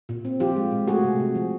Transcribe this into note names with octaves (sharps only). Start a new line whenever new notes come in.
A#2
C4
F3 F4 G4
G#3
A#2
A3 F#4 G#4
C3
C3
F3